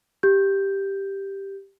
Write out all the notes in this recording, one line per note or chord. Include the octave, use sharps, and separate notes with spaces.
G4 G6